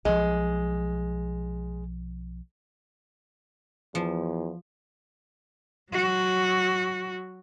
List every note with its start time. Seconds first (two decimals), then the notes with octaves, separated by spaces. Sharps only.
0.05 B1 F3 G#3
3.95 E2 F3
5.92 F#3 F#4